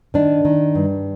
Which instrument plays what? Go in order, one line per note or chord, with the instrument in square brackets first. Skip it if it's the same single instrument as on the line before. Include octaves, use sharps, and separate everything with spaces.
[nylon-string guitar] D#3 D4
D#3
G2